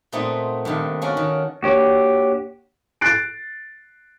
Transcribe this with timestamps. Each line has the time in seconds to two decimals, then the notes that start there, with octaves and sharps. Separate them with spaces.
0.12 A#2 A3 B3 C4 D#4
0.65 G2 C3 D#3
1.02 A#3 C#4 F#4 A4 A#4
1.17 D#3
1.63 A#3 D4 F#4 G4 C#5
3.01 F#6 A6 C7 D7